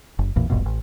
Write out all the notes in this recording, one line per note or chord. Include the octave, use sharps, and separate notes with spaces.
F#1
A1 E2 A#2
E1 A#1 G2 B2
A1